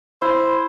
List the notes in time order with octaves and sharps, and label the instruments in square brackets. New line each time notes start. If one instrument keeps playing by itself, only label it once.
[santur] E4 [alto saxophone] C5